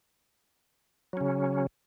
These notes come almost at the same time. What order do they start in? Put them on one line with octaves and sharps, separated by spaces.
F#3 C#4 C#3